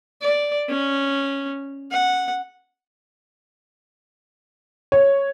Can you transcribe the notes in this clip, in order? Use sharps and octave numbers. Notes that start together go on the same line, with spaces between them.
D5
C#4
F#5
C#5